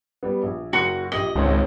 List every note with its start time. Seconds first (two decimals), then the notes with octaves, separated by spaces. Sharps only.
0.23 G3 B3
0.43 A#1
0.73 F#1 F#4 C#7
1.12 A#1 G4 D#5 F#7
1.36 G#1 C#2 C4 C#5